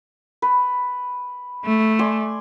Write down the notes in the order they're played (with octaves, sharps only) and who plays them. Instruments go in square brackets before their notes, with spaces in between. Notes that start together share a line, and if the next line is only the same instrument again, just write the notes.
[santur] B4
[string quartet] A3
[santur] D5 G#5 C6